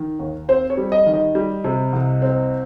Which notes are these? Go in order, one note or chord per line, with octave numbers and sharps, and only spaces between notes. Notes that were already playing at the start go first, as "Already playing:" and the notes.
Already playing: D#3
D#2
C4 C5
C#5
G3
D#5
D#3
D#5
G3
C3
C2
C4